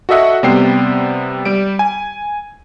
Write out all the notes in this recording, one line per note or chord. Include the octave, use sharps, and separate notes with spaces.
F#4 A4 D#5 E5 F#5
C3 G3 B3 C5 G5 C7
G3 D7
G#5